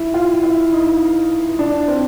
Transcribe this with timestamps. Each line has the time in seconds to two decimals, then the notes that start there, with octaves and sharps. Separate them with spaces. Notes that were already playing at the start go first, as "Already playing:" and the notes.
Already playing: E4
0.14 F4
0.43 E4
0.72 D#4
1.59 D4
1.88 C4